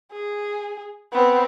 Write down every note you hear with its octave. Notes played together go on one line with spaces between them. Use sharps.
G#4
B3 C4